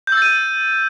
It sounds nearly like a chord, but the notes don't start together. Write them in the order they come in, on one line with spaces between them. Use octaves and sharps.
G6 E6 A6 D#7